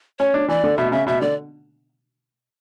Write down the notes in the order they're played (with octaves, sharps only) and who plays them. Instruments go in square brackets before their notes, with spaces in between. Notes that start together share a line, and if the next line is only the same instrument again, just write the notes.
[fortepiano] C#4 [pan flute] C#5
[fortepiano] D4
[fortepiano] E3 [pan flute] D5
[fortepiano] D3
[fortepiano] B2 [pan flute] E5
[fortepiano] C#3 [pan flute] E5
[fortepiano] B2 [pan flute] E5
[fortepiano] D3 [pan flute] D5